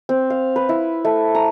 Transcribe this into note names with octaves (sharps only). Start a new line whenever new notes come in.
C4
F5
B4
E4
A3
A#5